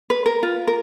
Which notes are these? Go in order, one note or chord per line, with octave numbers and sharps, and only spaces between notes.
B4
A#4
F4
A#4